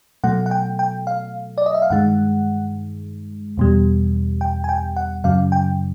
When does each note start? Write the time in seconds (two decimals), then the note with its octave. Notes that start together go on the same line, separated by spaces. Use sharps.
0.24 B2 F#3 A3 F#5
0.46 F#5
0.51 G5
0.79 G5
1.07 F5
1.58 D5
1.66 D#5
1.74 E5
1.82 F5
1.90 G2 D#3 G#3 F#5
3.57 E2 B2 G3
4.41 G5
4.64 G#5
4.69 G5
4.96 F#5
5.24 F#2 C#3 F#3 F5
5.52 G5